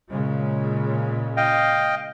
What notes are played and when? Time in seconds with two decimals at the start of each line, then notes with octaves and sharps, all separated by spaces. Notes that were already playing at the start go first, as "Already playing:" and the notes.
0.10 A#2 C#3 G#3
1.37 D#5 F5 G5